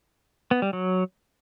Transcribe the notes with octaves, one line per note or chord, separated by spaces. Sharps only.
B3
G3
F#3